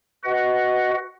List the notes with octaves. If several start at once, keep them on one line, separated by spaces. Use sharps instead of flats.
F#4 B4 D#5 F#5